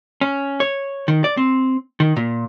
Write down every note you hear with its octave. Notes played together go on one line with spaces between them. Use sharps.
C#4
C#5
D#3
D5
C4
D#3
A#2